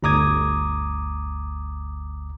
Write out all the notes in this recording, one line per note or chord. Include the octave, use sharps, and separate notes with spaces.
G1 D2 A#5 D6 D#6 G#6